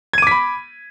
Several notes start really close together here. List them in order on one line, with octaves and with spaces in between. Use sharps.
G#6 D#7 D6 B6 B5